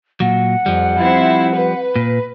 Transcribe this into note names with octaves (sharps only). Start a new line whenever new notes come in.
A#2 F#3 F#5
F2 F3 G3
C4 E4
B4
A#2